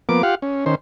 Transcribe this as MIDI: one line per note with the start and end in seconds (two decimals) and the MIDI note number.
0.09 0.22 53
0.09 0.22 58
0.09 0.22 59
0.09 0.22 86
0.23 0.35 65
0.23 0.35 67
0.23 0.35 77
0.23 0.35 78
0.42 0.65 61
0.66 0.75 51
0.66 0.75 61
0.66 0.75 72